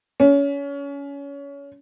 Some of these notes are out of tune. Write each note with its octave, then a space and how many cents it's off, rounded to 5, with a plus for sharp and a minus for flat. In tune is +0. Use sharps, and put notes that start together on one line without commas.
C#4 +25